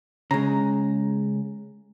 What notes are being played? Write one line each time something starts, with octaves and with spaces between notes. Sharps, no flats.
C#3 G#3 A#5